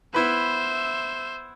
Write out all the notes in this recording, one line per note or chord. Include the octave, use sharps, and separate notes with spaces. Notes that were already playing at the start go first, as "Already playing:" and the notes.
B3 E4 B4 C5 E5